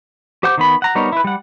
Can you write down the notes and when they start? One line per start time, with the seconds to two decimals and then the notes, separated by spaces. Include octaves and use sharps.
0.43 G4 C5 F#5 D6 G6
0.58 D#3 B3 B5
0.82 F#5 A#5
0.95 G3 B3 D#4 A#4 C#5
1.12 E4 B4
1.24 G3 F#5